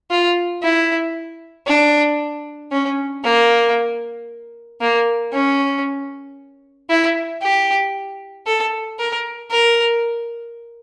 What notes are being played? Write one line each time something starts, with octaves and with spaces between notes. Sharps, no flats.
F4
E4
D4
C#4
A#3
A#3
C#4
E4
G4
A4
A#4
A#4